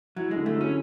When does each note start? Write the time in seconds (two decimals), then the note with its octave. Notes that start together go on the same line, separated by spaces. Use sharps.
0.16 F#3 E4
0.31 G#3
0.36 D3
0.46 A3
0.56 F#3 C#4